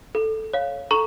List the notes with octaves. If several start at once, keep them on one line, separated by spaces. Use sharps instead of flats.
A4
C#5 F5
A4 A#5 C#6